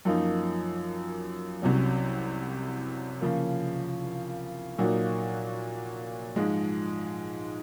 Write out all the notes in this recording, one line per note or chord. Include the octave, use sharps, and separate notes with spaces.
F#2 F3 A#3 D#4
C2 C3 F#3 C#4
C#3 F3 A#3
A#2 F#3 A#3 D#4 F#4
G#2 F3 G#3